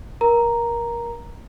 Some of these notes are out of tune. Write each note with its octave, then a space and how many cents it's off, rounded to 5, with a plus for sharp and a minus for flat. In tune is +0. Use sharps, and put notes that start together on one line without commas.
A#4 +20 A#5 +0